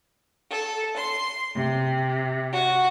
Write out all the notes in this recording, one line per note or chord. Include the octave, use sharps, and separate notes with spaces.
A4
C6
C3
F#4